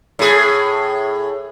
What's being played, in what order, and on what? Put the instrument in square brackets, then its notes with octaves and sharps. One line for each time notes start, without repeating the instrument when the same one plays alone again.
[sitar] A2 G#4